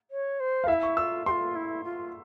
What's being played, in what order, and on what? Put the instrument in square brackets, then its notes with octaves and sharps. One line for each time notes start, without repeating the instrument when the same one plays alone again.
[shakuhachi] C#5
C5
[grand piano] F5
[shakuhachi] E4 [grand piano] E5
[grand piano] C#6
[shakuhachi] F4 [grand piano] E6
[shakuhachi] G4 [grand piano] C6
[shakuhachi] F4
E4
F4